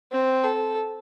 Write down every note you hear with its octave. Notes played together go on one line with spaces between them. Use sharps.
C4
A4